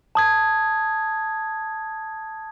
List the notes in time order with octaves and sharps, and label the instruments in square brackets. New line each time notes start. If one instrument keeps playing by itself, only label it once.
[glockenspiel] A5 D#6 G#6